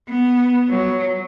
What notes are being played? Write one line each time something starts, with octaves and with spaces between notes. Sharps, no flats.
B3
F#3